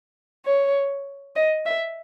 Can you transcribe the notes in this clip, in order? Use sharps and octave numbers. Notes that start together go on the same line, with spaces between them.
C#5
D#5
E5